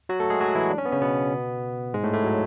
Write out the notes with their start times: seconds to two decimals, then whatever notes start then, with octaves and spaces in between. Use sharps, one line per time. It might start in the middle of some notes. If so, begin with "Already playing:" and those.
0.09 F#3 F#4
0.20 A3 A4
0.30 G#3 G#4
0.41 F#3 F#4
0.55 E3 E4
0.70 D4
0.78 C#4
0.85 B3
0.92 C#3 C#4
1.01 B2 B3
1.94 G#2 G#3
2.03 A2 A3
2.13 A2 A3
2.24 F#3